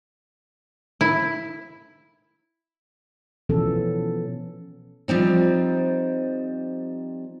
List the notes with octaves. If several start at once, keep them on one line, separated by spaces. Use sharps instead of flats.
E4
B2 E3 F3 B3 C#4 A4
F3 G3 C4 D#4